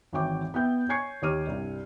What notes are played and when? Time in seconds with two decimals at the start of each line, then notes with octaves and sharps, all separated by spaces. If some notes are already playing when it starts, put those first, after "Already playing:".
0.13 G#1 E3 F#4 C#5 G5 D6
0.54 B3 E4 E5 G5 G6
0.89 C#5 G#5 C#6 G#6 C7 C#7
1.22 D#2 G4 C#5 D6 F6 D#7
1.47 C2 G2